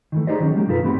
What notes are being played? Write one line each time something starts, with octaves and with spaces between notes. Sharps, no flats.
D#3 E3 A3
D#4 G4 G#4 C5 D5 D#5
D#3 F#3 C#4
F#3 G#3 A#3 G4
B1 F#2 D#4 F4 A4 B4
E2 A2 B3 C4 G4 B5